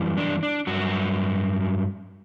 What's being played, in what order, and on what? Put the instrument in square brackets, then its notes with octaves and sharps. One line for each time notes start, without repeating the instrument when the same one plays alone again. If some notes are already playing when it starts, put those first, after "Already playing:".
Already playing: [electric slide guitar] F#2 E3 G3
D4
D4
G2 F#3 F#4